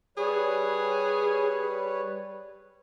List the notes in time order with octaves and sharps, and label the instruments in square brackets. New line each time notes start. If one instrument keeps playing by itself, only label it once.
[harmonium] G3 B4 C#5 [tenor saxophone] G#4